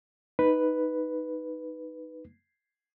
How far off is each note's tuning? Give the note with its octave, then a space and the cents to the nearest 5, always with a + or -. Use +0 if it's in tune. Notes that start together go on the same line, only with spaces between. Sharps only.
D#4 +0 B4 +0